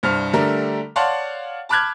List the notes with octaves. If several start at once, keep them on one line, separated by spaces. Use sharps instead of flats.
C2 G2 C5 F6
D3 G3 A3 A#4
C#5 D5 F5 F#5 A5 C6
A5 B5 D6 F6 F#6 G#6